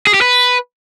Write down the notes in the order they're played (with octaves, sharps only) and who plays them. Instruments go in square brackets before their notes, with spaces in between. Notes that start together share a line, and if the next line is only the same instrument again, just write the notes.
[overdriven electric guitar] G#4
G4
B4